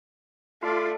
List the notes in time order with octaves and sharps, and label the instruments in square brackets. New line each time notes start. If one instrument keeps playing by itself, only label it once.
[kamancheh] A3 D5 [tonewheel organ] F4